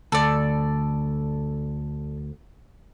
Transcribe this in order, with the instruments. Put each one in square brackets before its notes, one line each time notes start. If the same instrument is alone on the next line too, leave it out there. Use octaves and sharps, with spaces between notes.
[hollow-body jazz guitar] D2 [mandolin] A4 D5